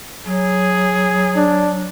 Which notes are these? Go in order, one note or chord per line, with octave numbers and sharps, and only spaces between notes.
F#3 G#4
D4